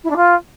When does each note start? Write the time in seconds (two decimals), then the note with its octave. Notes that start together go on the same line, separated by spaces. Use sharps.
0.03 E4
0.10 D4
0.16 F4